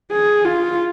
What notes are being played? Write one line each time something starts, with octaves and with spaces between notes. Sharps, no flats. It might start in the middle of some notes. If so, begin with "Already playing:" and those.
G#4
F4